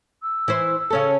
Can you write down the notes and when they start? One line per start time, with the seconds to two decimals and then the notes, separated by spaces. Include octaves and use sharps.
0.22 E6
0.48 E3 E4 C5
0.90 C#3 C#4 A4